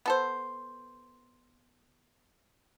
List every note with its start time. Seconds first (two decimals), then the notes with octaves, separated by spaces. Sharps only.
0.06 B3 A4 C5